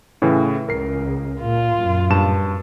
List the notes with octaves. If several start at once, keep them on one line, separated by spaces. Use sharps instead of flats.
A2 C#3 E3
C#2 C#3 A#4 C7
A#2 F4
F#2 A#2
G2 A5 E7